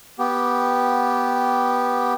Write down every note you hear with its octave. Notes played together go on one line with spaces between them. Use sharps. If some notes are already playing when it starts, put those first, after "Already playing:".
B3 G4